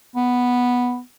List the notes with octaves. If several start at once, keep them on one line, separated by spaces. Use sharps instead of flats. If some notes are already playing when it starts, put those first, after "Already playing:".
B3